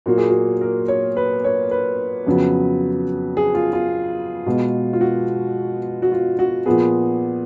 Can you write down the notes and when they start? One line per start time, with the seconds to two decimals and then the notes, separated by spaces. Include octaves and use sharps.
0.06 A#2 F#3 A#3 F#4
0.18 G#4
0.29 F#4
0.61 A#4
0.88 C#5
1.17 B4
1.44 C#5
1.71 B4
2.27 F2 C#3 F#3 B3
3.37 G#4
3.55 F4
3.73 F4
4.46 B2 G#3 B3
4.93 F4
5.01 F#4
6.02 F#4
6.12 F4
6.39 F#4
6.66 A#2 F3 B3 G#4